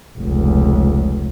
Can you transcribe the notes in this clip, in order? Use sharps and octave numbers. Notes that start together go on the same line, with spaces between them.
F1 C#2